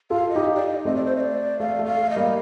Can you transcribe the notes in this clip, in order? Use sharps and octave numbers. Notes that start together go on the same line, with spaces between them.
F4 A4 F5
D#5
D#4 G4
D5
D#5
A3 C4 D#5
D5
C5
D#5
D5
A3 F5
A3
F5
A3
D#5
G3 A#3